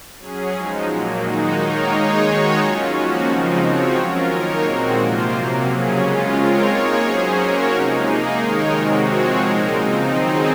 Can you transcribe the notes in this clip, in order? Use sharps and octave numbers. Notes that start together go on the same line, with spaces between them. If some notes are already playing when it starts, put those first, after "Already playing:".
F#3 C#4 G#4
F3 G#3 D#4
A#2 F#3 A#3
D#3 G#3 D#4 F#4
D#3 A#3 D#4 A#4 C#5
G#3 D#4 G#4 C#5
D#3 G#3 D#4 F#4 C#5
F#3 C#4 F4
F3 A#3 C#4 F#4
C#3 F3 G#3 C4 D#4
F3 C4 F#4 C#5
F#3 C#4 F4 A#4
D#3 A#3 D#4 A#4 C#5
A#2 G#3 C4 F#4
C3 F3 A#3 F4 C5
C3 F#3 A#3
C#3 F#3 C#4 G#4
C#3 G#3 C#4 F4
G#3 C4 F4 A#4 C#5
A#3 D#4 G#4 C#5
F#3 C#4 G#4 C5
A#3 C#4 F#4 A#4 C#5
C3 F3 G#3 D#4
A#3 D#4 G#4
D#3 G#3 D#4 A#4 C#5
C3 D#3 G#3 C4 F#4
F3 G#3 C4 F#4 C#5
A#2 G#3 D#4 A#4
C#3 F3 C4 D#4
D#3 F#3 C4 D#4 G#4